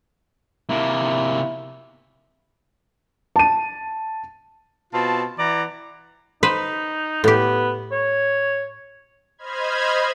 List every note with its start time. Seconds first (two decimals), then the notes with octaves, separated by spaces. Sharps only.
0.69 C3 A#3 E4
3.36 A5 D#7
4.94 B2 C4 F4 A5
5.39 E3 E4 D5 F#5 A#5
6.43 D#4 B4 C5
7.24 A2 B3 G4
7.92 C#5
9.38 C5 D#5 B5 F6 G#6